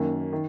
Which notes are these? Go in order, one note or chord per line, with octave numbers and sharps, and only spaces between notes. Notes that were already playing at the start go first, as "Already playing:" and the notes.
Already playing: F#2 D#3 A#3
D#3